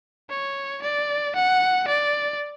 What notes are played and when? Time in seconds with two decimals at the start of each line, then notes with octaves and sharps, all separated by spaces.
0.29 C#5
0.82 D5
1.35 F#5
1.88 D5